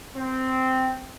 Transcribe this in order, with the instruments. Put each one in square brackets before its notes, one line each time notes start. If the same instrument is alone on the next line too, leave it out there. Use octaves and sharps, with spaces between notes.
[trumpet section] C4